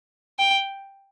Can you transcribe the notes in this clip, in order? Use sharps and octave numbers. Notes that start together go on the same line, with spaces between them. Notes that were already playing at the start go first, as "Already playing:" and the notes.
G5